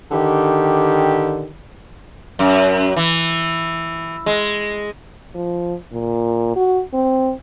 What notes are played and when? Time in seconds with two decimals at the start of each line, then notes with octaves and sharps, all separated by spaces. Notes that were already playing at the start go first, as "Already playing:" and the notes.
0.11 D3 D#3 G4
2.39 F#2
2.96 E3
4.26 G#3
5.34 F3
5.92 A#2
6.56 F#4
6.94 C4